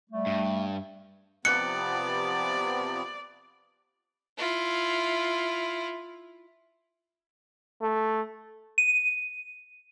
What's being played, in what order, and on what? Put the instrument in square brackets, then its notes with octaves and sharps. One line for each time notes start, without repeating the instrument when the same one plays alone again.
[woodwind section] G3 A3
[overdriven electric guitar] G2
[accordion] C3 F3 B3 [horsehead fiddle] D5 [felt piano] F#6 [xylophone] C#7
[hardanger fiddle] E4 F4
[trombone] A3
[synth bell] D#7